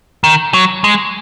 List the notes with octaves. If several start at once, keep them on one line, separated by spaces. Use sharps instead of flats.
D#3
F#3
G#3